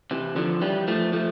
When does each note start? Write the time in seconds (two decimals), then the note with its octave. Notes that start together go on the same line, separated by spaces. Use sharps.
0.11 C3 E3
0.36 D3 F3
0.62 E3 G3
0.88 F3 A3
1.13 F3 A3